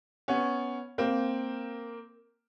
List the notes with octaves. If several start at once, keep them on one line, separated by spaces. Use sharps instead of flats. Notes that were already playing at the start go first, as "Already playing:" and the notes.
B3 C#4
A#3 C4